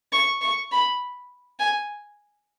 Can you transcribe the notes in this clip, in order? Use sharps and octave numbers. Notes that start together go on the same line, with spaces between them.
C#6
C#6
B5
G#5